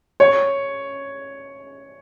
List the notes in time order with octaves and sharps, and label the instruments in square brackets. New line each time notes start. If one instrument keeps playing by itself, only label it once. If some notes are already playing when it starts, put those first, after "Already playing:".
[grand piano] C#5